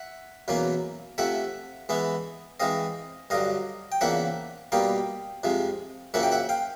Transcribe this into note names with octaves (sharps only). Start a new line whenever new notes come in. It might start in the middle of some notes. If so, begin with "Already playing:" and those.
Already playing: E5 F#5
E2 B2 F#3 A#3 C#4
C3 F3 A3 E5 F#5
E3 G#3 B3 E4
E3 G#3 C4 D#5 F5
G2 D3 F#3 D#5 F5
G5
E2 C#3 F3 A#3 D4 E5 F#5
B2 G3 A#3 D#4 F5 G5
F2 C3 F3 G#3
F#2 C#3 F3 A#3 C#4 E5 F#5
G5
E5 F#5
F5 G5